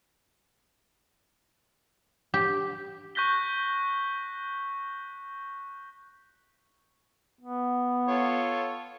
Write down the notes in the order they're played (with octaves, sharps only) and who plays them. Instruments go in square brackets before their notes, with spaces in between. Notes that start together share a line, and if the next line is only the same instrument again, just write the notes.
[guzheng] G4
[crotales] C#6 F#6 G6 A#6 B6 G7
[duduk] B3
[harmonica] F4 A4 C#5